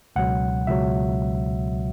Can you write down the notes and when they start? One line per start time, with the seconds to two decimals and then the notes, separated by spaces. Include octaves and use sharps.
0.16 C#2 B2 F#3 F#5
0.67 C#2 B2 F#3 E5